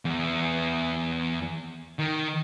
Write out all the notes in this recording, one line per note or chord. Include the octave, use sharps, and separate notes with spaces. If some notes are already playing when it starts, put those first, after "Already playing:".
E2
D#3